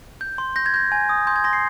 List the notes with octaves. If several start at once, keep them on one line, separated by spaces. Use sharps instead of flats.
G6
C6
G6 A#6
G#6
G6 A#6
G#5 G#6
D#6
C6 G6
G#6
C6 A#6
C7